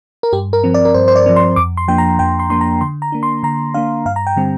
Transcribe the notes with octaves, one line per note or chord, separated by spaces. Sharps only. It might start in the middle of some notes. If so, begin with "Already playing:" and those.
A#4
G2 G4
A#4
F3 C4
D5
A#4
G2 C5
C5
D5
F3 C4
C6
F2 D6
C6
F3 A#3 D4 G5
A#5
F2 G5
C6
F3 A#3 D4 C6
A#5
D3 C6
A#5
A#3 D4
C6
D3 A#5
A#3 D4 F5
G2 F5
A#5
G5
D3 G3 C4